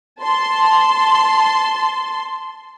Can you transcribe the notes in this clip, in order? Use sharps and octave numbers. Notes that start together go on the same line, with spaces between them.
A5 C6